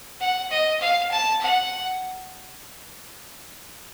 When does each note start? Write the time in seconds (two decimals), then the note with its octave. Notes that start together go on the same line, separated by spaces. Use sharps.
0.20 F#5
0.51 D#5
0.81 F5
1.11 A5
1.41 F#5